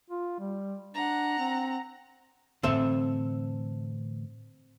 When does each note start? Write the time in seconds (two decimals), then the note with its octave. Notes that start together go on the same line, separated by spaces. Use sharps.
0.10 F4
0.40 G3
0.95 D4 F#5 A#5
1.39 C4
2.63 A2 D3 E3 C4 A4 E5